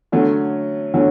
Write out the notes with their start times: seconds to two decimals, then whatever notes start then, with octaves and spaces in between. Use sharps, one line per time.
0.12 D3 F#3 A3 C#4
0.94 D3 F#3 A3 C#4